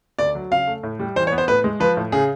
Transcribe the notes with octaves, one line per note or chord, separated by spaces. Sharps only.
D2 D5
F#3
C#3 F5
A3
A2
G3
E3 C5
C#5
B3
C5
A2 B4
G#3
F3 B4
A2
C#3 G#4